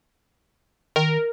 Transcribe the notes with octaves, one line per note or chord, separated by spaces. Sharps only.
D#3 A#4